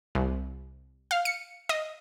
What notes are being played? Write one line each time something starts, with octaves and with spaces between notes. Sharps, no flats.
C2
F5
C#7
D#5